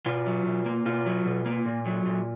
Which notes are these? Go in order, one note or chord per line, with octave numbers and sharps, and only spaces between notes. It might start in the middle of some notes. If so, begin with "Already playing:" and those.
B2 F4
F#3
B2
A#3
B2 F4
F#3
B2
A#3
A#2
F#3
A#2